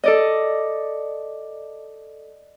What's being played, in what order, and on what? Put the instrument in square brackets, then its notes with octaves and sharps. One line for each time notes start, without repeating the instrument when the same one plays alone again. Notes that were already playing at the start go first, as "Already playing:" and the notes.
[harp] A4 D5 D#5